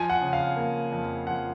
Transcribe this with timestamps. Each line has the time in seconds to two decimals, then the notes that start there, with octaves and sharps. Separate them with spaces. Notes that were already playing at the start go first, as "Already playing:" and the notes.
Already playing: F3 G#5
0.10 F#5
0.21 C#3
0.33 F5
0.56 A#3
0.92 F2
1.27 F3 F#5